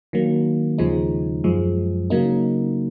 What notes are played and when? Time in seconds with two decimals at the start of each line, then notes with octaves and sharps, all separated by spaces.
0.13 D#3 F#3 A#3
0.78 D#2 C#3 F3 G#3 D#4
1.44 F#2 F3 G#3
2.10 C#3 F#3 A#3 D#4